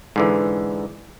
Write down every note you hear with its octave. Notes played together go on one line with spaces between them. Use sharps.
G#2 D3 E3